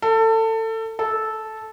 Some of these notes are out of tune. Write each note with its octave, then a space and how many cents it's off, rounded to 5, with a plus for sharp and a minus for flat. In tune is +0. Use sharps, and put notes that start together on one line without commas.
A4 +25
A4 -10